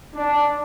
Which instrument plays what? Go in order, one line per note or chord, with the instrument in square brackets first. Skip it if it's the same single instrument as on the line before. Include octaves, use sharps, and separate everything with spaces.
[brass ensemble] D4